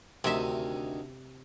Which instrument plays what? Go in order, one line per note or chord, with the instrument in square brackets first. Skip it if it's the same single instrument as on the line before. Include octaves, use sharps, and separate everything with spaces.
[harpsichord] D2 D#3 G#5 [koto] C3 E5